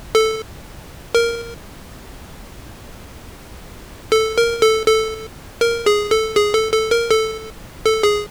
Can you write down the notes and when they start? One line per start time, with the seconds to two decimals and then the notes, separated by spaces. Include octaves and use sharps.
0.15 A4
1.15 A#4
4.12 A4
4.37 A#4
4.62 A4
4.87 A4
5.61 A#4
5.86 G#4
6.11 A4
6.36 G#4
6.54 A4
6.73 A4
6.91 A#4
7.11 A4
7.85 A4
8.03 G#4